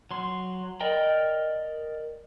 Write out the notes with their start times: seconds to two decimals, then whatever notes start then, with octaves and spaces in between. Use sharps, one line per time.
0.11 F#3 C6
0.80 A#4 D5 D#5 G5 A#5